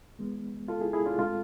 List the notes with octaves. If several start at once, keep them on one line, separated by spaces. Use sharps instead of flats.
E3 G#3 B3
F4 A4
E4 G#4
E4 G#4
D4 F4
A2 G#3 C4 F4 A4